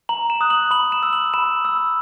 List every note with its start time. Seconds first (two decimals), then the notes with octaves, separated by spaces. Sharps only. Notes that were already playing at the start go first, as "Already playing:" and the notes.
0.09 A#5 F#7
0.30 E7
0.41 D#6 F#6
0.50 F#7
0.71 B5 F#7
0.92 E7
1.03 E6
1.13 F#7
1.34 B5 E7
1.65 E6